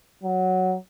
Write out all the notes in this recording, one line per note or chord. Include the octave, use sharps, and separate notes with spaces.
F#3